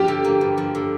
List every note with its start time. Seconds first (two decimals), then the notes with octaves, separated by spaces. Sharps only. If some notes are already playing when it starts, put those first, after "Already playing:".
Already playing: G2 F3 G4
0.08 D3
0.24 A#3
0.41 G2
0.57 F3
0.75 D3